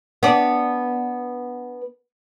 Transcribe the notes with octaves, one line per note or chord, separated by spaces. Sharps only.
B3 D4